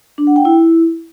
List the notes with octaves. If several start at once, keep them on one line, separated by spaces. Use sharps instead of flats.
D4
F#5
G5
E4